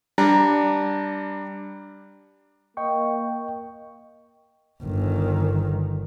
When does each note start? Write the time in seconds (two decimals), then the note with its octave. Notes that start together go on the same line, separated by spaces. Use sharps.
0.18 G3 D4 A#5
2.77 A#3 D#5 G5 C#6
4.82 G1 D#3